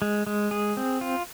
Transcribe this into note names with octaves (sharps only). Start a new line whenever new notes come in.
G#3
G#3
G#4
C4
F4